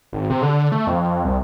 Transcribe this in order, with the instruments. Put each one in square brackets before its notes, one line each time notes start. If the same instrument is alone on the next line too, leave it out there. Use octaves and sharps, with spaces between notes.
[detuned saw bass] G#1
C3
D3
A3
F2
F2
C2